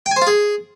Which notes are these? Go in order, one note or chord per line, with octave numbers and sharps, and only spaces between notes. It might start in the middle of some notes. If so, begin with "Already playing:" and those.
G5
G#5
C5
F4
G#4